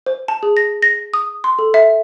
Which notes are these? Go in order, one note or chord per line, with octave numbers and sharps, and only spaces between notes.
C5
A5
G#4
A#6
A#6
D#6
C6
A4
E5